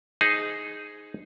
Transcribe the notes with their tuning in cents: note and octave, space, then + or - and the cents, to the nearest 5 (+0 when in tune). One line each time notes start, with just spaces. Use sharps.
D#4 +0 G#4 +0 C5 -10